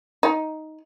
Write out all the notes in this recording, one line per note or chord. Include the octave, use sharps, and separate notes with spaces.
D#4